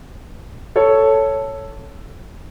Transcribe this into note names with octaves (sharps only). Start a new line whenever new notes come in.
A4 C#5